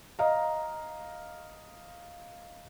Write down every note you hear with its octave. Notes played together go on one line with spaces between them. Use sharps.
D#5 F5 A#5